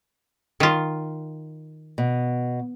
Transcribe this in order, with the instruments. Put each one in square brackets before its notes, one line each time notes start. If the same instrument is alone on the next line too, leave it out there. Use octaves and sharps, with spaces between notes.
[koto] D#3 F4
[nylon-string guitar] B2